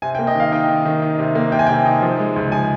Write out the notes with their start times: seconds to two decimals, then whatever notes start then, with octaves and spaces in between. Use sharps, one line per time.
0.02 C3 G#5
0.15 G5
0.19 A#3
0.27 D#5
0.35 D#3 F5
0.52 D#4 G5
0.69 D#3
0.85 D#3
1.02 D#4
1.19 C3
1.35 A#3
1.52 C3 G5
1.59 G#5
1.66 C3 G5
1.85 D#4
2.02 F3
2.19 G#3
2.36 C#2
2.52 F3 G#5